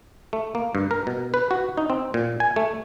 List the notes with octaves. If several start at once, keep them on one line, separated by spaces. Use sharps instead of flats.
A3
A#3
G2
A#4
B2
B4
F#4
D#4
C4
A#2
G#5
A3